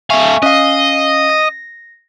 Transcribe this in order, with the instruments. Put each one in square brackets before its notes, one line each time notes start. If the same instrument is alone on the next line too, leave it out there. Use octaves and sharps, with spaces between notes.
[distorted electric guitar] A3 F5 [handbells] E5 G#5 C#6
[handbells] C#4 F5 [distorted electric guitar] D#5
[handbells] A#6